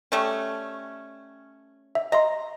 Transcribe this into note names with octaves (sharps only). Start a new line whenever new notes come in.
G3 A3 C#4
E5
D#5 E5 A#5 C6